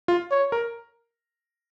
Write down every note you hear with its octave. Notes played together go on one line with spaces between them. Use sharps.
F4
C#5
A#4